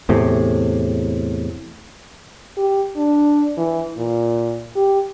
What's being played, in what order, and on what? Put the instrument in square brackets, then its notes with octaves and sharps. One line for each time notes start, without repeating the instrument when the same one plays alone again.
[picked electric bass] E2 A2 C3
[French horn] G4
D4
E3
A#2
G4